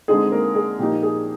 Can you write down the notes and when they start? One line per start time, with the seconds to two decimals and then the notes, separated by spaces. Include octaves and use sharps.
0.08 D3 G#3 C4 D#4 G#4
0.32 A#3 A#4
0.55 G#4
0.79 A#2 F3 A#3 D#4 G4
1.03 G#4